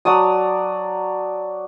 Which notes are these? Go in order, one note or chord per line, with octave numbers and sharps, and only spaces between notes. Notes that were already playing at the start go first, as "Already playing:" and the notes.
F#3 D5 A5 D#6